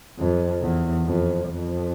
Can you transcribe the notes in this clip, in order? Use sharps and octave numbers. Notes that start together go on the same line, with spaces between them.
F2
E2
F2
F2